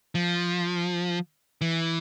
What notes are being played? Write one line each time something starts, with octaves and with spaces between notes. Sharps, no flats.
F3
E3